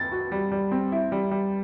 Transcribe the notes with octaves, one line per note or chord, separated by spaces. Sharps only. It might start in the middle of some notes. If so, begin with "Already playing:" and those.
Already playing: A6
F#4
G3
G3
C4
E4
G3
G3